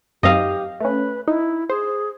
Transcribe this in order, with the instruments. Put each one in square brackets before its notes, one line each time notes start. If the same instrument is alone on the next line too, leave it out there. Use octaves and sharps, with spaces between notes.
[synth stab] F#2 C4 D#4 [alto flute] G4 [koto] D#5 F5
[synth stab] A3 C#4 [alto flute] B4
[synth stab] D#4 [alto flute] E4
[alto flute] G#4 [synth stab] C5